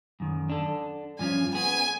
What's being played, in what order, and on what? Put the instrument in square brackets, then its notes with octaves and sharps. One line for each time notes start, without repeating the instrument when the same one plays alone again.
[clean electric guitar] F#2 D#3
D4 A4
[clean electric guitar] G2 F3 C#4 [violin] G#5
[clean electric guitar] B3 G#4 [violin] G#5